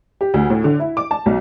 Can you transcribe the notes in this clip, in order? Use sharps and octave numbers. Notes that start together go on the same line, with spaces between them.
G4
D2
A2
D3
E4
D6
A5
B1